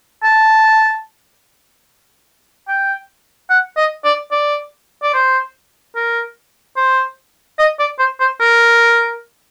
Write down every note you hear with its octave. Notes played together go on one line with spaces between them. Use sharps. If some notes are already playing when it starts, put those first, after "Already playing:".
A5
G5
F#5
D#5
D5
D5
D5
C5
A#4
C5
D#5
D5
C5
C5
A#4